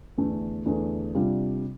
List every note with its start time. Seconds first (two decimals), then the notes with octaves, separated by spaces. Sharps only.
0.17 E2 D3 A3 D4 A4
0.66 E2 D3 A3 D4 A4
1.15 C3 G3 D4 F4